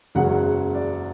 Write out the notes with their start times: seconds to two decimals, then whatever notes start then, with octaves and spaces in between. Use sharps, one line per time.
0.15 F#1 E2 C#3 G#3 F#4 F#5
0.75 D5